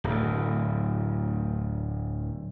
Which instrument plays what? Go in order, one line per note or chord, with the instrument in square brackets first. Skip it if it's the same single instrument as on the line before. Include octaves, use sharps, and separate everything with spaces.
[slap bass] D1 D2